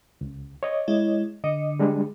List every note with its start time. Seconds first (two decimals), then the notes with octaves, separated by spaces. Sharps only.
0.21 C#2
0.63 C#5 D#5
0.88 G#3 E4
1.44 D3 D#5
1.79 G3 G#3 D4